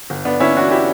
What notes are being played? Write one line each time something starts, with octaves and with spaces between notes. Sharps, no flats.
G1
G1 B3 D4
G1 C#4 E4
E3 D4 F#4
E4 G4